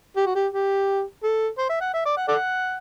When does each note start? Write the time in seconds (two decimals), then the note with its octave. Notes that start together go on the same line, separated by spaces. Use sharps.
0.16 G4
0.26 F#4
0.35 G4
0.52 G4
1.23 A4
1.58 C5
1.69 E5
1.81 F#5
1.94 E5
2.05 D5
2.17 F#5
2.28 A4 D5 F#5